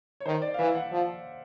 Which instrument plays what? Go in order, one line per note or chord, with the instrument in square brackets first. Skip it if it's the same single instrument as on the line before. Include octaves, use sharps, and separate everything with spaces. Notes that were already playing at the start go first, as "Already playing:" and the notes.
[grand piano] C#5
[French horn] D#3 [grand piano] C5
[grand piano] D5
F5
[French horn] E3 [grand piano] E5
[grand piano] F#5
[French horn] F3